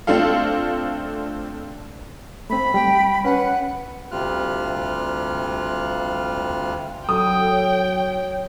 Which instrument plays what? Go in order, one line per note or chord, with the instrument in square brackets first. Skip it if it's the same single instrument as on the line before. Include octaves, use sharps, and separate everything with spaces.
[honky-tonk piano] A3 C4 D4 F4 A4 F5
[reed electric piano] A3 C4 [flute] B5
[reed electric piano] G3 [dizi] G5
[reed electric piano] C#4 [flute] B4 [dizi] F#5
[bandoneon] D2 C3 G3 F4 F6 F#6
[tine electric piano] F#3 F#4 [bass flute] A4 [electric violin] G5 [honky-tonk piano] D#6
[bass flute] C#5